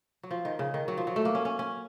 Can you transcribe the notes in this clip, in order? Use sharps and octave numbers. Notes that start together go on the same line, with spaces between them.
F#3
F3
D#3
C#3
D#3
F#3
F3
F#3
A3
A#3
C#4
C#4
C#4